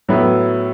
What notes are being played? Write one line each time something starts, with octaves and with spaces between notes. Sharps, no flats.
A2 F#3 B3 E4